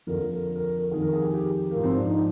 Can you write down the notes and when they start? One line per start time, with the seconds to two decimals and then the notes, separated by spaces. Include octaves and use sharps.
0.07 F2 D3 F3 A#4
0.31 A#4
0.55 A#4
0.79 A#4
0.91 F2 D#3 G#4
1.02 A#4
1.13 G#4
1.24 G4
1.34 G4
1.71 A#3
1.76 G#2 F3
1.84 C4
1.95 D4
2.08 D#4